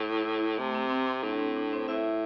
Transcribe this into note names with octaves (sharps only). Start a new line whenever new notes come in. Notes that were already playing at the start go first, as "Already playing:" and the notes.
Already playing: A2
E4
E4
C3 A3
C4
C4
C4
A2 D4
C4
D4
C4 C5
A2 E4 E5